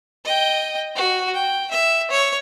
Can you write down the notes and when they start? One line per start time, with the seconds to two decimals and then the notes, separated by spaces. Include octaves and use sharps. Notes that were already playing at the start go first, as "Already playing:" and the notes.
0.25 D#5 G5
0.96 F#4
1.34 G5
1.71 E5
2.11 C#5